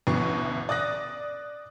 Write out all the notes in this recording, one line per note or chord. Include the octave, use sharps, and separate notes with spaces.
A1 D2 B2 C#6
D5 D#6 F#6 A#6